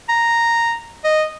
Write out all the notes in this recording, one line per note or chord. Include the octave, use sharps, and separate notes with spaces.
A#5
D#5